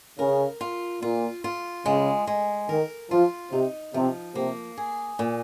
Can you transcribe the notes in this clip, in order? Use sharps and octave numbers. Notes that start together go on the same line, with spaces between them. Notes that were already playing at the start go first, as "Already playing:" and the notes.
C#3 A#4
F4
A#2 F4
F4
C#3 G#3
G#3
D#3 A#4
F3 F4
C3 D#4
C3 F3
C3 A#3
G#4
A#2